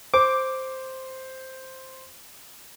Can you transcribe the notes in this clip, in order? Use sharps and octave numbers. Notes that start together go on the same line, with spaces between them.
C5 D6